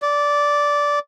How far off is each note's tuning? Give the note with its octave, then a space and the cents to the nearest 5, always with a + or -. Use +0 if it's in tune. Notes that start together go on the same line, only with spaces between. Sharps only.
D5 -10